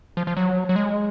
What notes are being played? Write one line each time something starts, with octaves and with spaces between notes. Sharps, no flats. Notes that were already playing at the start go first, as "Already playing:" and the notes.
F3
F3
F#3
F#3
G#3